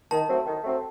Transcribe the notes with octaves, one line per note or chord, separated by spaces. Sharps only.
D#3 A5
F#3 A3 C4
D#3
F#3 A3 C4